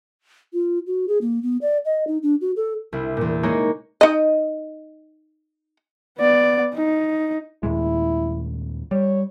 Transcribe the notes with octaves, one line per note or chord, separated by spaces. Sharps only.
F4
F#4
G#4
A#3
B3
D5
D#5
D#4
D4
F#4
A4
C2 D4 E4
E2 A#2
G#3 A#3 D#4 G#4 A#4 C#5
D#4 D#5
B3 D5
D#4
D#2 A#2 G#3 E4
G3 C#5